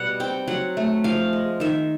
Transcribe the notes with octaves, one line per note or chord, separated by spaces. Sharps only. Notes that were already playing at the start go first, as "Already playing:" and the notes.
Already playing: B2 G3 F#5
C4 G5
F#3 F#5
A3
F3 F5
G#3
D#3 E5